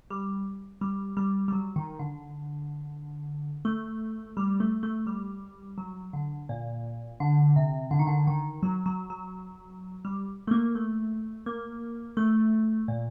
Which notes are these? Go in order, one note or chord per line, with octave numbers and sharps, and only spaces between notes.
G3
G3
G3
G3
F#3
D#3
D3
A3
G3
A3
A3
G3
F#3
D3
A#2
D3
C3
D3
D#3
D3
D#3
F#3
F#3
F#3
G3
A3
A#3
A3
A#3
A3
A#2